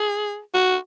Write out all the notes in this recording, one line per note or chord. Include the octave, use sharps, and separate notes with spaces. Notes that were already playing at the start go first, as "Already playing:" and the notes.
Already playing: G#4
F#4